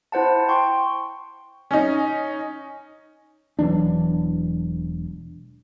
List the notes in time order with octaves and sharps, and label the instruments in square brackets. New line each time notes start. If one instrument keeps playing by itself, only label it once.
[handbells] E4 C5 F#5 A5
G5 C6 C#6
[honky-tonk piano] C#4 D#4
[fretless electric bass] E1 E3 F#3 D4